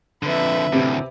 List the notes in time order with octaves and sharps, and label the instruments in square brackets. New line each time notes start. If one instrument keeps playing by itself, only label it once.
[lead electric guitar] F2 D3 [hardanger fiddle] B4 E5
[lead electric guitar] D2 A2 [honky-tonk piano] C3